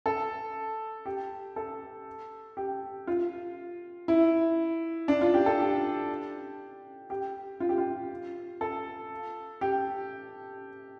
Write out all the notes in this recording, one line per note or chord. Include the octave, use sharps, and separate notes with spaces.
A4
G4
A4
G4
F4
E4
D4
F4
G4
A4
G4
G4
F4
G4
F4
A4
G4